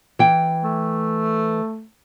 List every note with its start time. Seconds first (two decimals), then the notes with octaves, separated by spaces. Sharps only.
0.19 E3 G5
0.64 A3